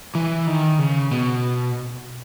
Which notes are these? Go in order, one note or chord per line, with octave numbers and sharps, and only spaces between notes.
E3
D#3
C#3
B2